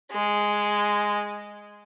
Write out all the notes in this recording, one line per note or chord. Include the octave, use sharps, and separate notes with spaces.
G#3